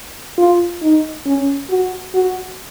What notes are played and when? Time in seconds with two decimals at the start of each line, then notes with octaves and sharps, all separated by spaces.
0.38 F4
0.82 D#4
1.26 C#4
1.70 F#4
2.14 F#4